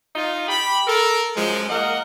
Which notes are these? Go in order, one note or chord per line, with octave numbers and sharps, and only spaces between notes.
D#4 F4
G4 B5
A4 A#4
F#2 F3 G#3
A#3 A#4 D#5 F#5